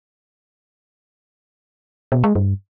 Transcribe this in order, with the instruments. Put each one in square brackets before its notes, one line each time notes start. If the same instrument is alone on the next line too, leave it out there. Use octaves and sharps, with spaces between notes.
[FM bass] B2
G#3
G2